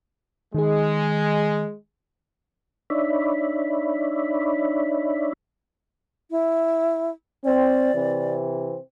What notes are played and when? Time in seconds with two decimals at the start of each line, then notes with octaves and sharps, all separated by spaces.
0.54 D#3 G#3 G#4
2.90 D4 D#4 C#5 D5 E5 B5
6.31 E4
7.45 C4 D5
7.95 C3 E3 C4